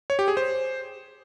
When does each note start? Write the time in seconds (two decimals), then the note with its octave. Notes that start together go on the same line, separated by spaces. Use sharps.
0.10 C#5
0.19 G4
0.28 G#4
0.37 C5